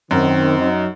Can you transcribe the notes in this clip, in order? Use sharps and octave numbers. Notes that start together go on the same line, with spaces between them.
F#2 D#3 C4
F#3 D#4